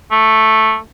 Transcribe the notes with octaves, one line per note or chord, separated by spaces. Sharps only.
A3